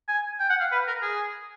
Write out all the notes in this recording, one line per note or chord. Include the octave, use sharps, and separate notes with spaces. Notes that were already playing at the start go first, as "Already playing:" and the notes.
G#5
G5
F#5
F5
B4
A#4
G#4